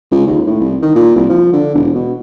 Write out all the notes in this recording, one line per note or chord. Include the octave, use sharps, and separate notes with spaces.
C#2
D#2
A2
C2
D#3
A#2
C2
F3
D3
E1
B2